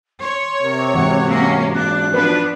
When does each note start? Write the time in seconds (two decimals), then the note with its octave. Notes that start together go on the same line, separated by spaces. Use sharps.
0.22 C#5 C6
0.63 C3 A#4
0.94 G#2 E3 F#5
1.30 A#3 C#4
1.75 D4 F#6
2.13 F3 B3 D4 B4